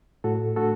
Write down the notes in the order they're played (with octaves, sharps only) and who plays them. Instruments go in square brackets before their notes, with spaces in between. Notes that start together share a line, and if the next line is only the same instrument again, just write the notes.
[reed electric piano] A2 F#4 A4
A3 D4 F#4 A4